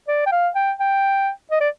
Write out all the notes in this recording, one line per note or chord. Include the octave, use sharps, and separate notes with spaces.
D5
G5
F5
G5
G5
D#5
D5